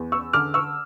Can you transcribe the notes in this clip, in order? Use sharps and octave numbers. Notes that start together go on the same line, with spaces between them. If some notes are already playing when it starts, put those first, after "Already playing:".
Already playing: E2
C#6 E6
D3 D6 F6
C#6 E6